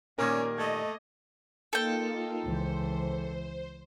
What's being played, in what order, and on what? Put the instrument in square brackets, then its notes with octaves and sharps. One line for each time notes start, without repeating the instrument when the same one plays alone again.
[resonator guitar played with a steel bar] A#2 D#3 G3 [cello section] A#3 [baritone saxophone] C#4 [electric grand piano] A#4 D6 G#6
[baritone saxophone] A3 [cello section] D#5 [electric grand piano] G#6
[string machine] A#3 D#4 F4 [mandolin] A4 G5
[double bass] C#2 E3 [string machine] C5